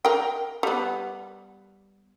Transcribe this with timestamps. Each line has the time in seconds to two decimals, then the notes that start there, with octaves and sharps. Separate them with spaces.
0.05 A#4 G5
0.63 G3 B3